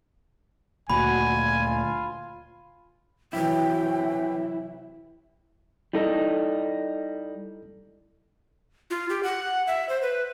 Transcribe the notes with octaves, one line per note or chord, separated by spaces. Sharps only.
D2 A#2 F#4 G#5 B5
F4
C3 E3 F#3 E4 G5
G3 D#4 E4 A4
F4
G4
F#5
E5
C5
B4